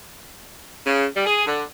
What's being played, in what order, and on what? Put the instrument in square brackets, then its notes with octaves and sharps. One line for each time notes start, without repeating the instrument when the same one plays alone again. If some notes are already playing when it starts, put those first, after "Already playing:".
[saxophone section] C#3
G3
G#4
D3